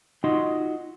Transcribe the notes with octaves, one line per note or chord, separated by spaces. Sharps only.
D#4 F4 F#4 D#5 C6